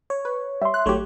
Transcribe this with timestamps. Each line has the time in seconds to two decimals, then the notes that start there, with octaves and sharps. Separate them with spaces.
0.10 C#5
0.25 B4
0.62 G3 E5 C6
0.74 F#6
0.86 G#1 F#3 A3 G4 C#5